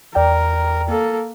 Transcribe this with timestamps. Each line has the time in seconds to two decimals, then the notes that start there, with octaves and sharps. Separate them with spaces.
0.15 E2 A#4 D5 G5
0.88 A#3 A4